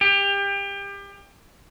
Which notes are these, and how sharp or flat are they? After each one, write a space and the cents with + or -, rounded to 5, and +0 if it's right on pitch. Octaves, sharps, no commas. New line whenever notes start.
G4 +30